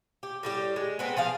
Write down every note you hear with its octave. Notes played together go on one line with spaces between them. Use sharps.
G4
A2 G3 G4
G#3
B3 C4 D#4 G#4
F3 G#4 F5